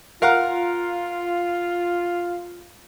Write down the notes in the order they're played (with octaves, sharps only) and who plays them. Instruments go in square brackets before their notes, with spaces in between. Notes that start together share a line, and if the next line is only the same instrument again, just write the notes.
[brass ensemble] F4 [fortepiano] A#4 F5 F#5